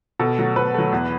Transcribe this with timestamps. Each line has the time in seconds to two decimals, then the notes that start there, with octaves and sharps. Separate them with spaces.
0.20 B2 A4
0.39 F#3 A3
0.56 B2 B4
0.74 F#3 A3
0.92 E2